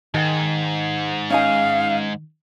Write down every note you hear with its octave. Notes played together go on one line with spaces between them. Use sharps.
G#2 D#3 D#5 G5
C#4 D#4 F5 G#5